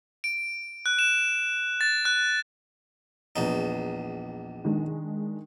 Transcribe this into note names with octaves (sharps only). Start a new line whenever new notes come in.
D7
F#6
E7
A6
F#6
A#1 E2 D#4
D#3 G#3 D4